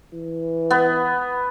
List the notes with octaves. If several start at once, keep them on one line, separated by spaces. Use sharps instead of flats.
E3
B3